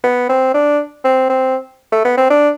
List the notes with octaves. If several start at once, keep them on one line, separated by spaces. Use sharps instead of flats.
B3
C4
D4
C4
C4
A3
B3
C4
D4